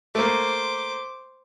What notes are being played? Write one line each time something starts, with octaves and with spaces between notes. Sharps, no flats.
A3 A#3 C5 D6